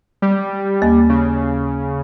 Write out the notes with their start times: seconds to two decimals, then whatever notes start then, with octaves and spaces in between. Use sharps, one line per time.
0.22 G3
0.82 D#2 A#3
1.09 C#3